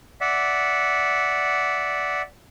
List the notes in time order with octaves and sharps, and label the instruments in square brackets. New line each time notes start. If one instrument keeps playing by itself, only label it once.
[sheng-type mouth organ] D5 E5 F#5